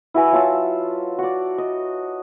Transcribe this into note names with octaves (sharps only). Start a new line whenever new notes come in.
E4 F#4 B4 G#5
F#3 F4 A5 E6
F#4 D5
D#5